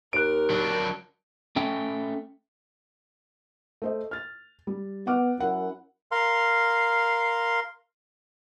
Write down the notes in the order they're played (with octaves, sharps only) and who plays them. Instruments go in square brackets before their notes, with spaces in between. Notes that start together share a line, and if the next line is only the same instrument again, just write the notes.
[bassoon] D#2 [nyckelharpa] A#4 [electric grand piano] F#6 D7
[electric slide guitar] F#3 D4
A3 C#4 G5
[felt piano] A3 C5 D#5
F6 A6
G3
[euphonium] B3 [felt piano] F#5 D6 F6
[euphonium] F#2 [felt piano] E4 A#4 F#5
[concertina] A#4 F5 C6